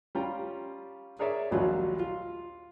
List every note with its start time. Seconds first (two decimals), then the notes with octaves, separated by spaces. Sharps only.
0.15 G3 C#4 F4 G5 A#5
1.19 G#4 A#4 C#5 D5 E5
1.51 A#1 D#2 F#3 G3 F4
1.99 F4